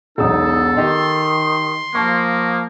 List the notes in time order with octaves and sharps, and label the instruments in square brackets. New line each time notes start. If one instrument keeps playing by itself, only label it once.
[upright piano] E1 B1 E6 [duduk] D#4 [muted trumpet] A4
[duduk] D#3 [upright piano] D#4 G4 D#5 [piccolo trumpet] C6
[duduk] F3 [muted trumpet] A#3 [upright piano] A5 C#6